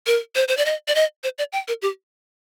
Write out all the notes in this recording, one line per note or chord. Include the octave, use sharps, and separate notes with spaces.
A#4
C5
C5
D5
D#5
D5
D#5
C5
D5
G5
A#4
G4